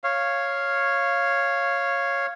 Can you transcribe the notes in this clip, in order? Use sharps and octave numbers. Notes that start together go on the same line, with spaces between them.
C#5 F5